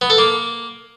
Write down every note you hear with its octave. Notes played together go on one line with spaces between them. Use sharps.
B3
A4
A#3